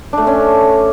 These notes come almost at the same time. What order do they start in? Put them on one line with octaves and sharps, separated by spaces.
D4 A3 A4 C#4